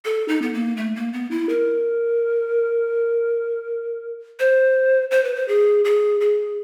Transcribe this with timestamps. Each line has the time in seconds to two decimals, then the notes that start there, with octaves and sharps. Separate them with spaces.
0.05 A4
0.28 D#4
0.42 B3
0.53 A#3
0.77 A3
0.96 A#3
1.13 B3
1.31 E4
1.49 A#4
4.40 C5
5.11 C5
5.24 B4
5.36 C5
5.48 G#4
5.85 G#4
6.21 G#4